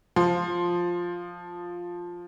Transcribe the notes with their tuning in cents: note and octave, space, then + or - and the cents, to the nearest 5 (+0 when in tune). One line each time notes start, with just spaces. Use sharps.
F3 +5 C6 +0